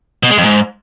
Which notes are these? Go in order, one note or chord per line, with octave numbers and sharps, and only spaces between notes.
B2
G#3
F2
G#2